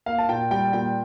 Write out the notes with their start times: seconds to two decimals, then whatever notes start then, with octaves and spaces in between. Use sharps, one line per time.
0.06 A#3 F5
0.18 A5
0.29 A#2 G5
0.51 G3 G5
0.73 A#2 G5